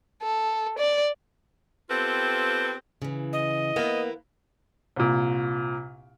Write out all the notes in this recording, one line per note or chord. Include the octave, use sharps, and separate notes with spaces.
A4
D5
B3 C4 F4 G4 A4 B4
C#3 E3
D#5
A#3 B3 E4 B4
C2 A#2